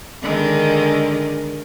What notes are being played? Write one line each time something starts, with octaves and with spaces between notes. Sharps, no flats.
D3 D#3 G#3